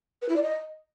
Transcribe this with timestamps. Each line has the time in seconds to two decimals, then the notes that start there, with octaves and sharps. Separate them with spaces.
0.22 B4
0.29 E4
0.36 D5
0.43 D#5